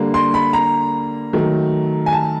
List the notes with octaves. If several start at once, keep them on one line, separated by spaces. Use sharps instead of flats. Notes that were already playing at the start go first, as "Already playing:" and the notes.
Already playing: D3 G3 A#3
C6
B5
A#5
D#3 F#3 A3
G#5
A5